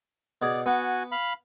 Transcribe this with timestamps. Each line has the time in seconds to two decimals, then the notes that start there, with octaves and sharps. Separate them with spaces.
0.42 B2 G#4 D5
0.66 B3 F#4 G#5
1.12 F5 B5